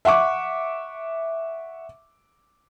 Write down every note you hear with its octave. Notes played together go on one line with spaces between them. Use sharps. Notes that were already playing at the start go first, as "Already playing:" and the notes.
E5 F#5 C#6 D6